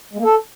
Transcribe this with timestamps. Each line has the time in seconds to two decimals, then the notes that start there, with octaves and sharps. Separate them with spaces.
0.13 G#3
0.19 A#3
0.24 A4